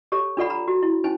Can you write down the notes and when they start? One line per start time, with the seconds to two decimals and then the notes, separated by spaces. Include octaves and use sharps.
0.12 G4 A4 C#5
0.37 D4 F4 A4 D5 F#5 B5
0.50 A#5 B5
0.68 F#4
0.83 E4
1.04 C#4 D#4 C5 G#5